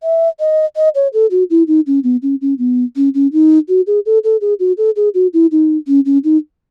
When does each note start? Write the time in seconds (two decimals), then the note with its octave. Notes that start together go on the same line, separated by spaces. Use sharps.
0.03 E5
0.40 D#5
0.76 D#5
0.95 C#5
1.14 A4
1.31 F#4
1.50 E4
1.68 D#4
1.87 C#4
2.04 B3
2.23 C#4
2.41 C#4
2.59 B3
2.96 C#4
3.15 C#4
3.33 D#4
3.69 F#4
3.87 G#4
4.06 A4
4.24 A4
4.41 G#4
4.60 F#4
4.78 A4
4.96 G#4
5.14 F#4
5.34 E4
5.52 D#4
5.88 C#4
6.05 C#4
6.24 D#4